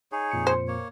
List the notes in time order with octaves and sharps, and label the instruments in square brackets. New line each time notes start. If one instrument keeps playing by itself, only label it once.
[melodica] D#4 G#4 C#5
[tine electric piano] F2 A#2 C#7
[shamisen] C5
[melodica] A#3 C#5